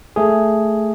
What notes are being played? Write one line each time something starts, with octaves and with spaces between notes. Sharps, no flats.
A3 G#4